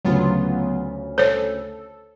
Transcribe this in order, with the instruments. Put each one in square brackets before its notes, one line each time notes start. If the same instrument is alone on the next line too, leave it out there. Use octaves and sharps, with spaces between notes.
[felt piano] D2 C#3 [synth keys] F#3 B3 F4
[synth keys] A4 [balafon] C5 C#5